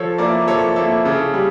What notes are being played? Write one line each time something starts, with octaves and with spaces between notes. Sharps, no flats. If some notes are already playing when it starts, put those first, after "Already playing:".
Already playing: F3 A4 C#5
A#3 E4 A#4 D5
F3 A4 C#5
A#3 E4 A4
C#3 A4
G3